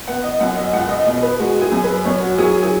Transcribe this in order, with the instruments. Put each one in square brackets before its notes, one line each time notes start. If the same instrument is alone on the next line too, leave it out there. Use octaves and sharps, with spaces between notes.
[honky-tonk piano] B3 F#5
D#5
F#2 F#5
D#5
C#2 F#5
D#5
B2 D#5
B4
G#3 F#4
G#4
F#2
B4
F#2 C#5
F#4
F#3 G#4
G#4